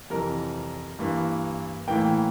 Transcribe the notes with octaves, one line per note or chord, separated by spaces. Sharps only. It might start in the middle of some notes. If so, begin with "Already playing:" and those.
F2 C3 E3 G3 A#4
G2 E3 A#3
A2 E3 A#3 G5